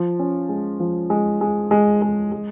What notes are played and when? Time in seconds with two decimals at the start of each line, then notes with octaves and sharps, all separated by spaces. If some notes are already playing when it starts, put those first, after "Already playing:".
Already playing: F3
0.19 C#4
0.49 G#3
0.80 F3
1.10 G#3
1.41 G#3
1.71 G#3
2.02 G#3
2.32 G#3